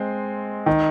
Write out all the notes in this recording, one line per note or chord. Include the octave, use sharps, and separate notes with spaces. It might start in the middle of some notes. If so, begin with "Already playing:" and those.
Already playing: G#3 C4
D#3